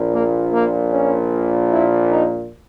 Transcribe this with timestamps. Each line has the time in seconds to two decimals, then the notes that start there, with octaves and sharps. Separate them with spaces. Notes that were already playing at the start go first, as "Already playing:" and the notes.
Already playing: A#1 A#2
0.13 A#3
0.52 A#3
0.92 C#4
1.72 E4
2.12 D#4